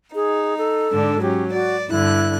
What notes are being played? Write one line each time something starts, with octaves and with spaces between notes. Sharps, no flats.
D#4 G#4
A4
G#2 D3 D4
F#3 C#4 G4
F#4 D5
G2 D3 E4 F#6